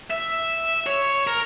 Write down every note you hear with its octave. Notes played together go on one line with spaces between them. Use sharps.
E5
C#5
A#4